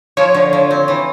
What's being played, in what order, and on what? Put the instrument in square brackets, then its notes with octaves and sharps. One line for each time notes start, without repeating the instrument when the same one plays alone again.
[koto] F3 [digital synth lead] C#5
[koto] D3
F3
C4
E3